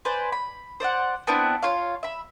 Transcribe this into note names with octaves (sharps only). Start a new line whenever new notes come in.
B4 C5 D5 G#5
B5
C5 D5 E5 F#5
B3 C4 D4 E4
F4 C#5 F5
E5 B5